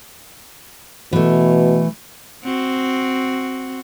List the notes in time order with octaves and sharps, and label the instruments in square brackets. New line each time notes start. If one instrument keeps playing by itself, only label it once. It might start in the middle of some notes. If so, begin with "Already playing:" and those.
[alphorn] B2 [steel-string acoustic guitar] E3 A3
[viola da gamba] C4 F#4